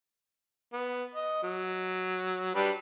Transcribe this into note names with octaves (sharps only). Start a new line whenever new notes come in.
B3
D#5
F#3
G3 D4 B4